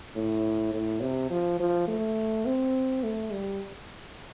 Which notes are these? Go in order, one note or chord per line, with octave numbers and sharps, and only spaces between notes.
A2
A2
C3
F3
F3
A3
C4
A3
G3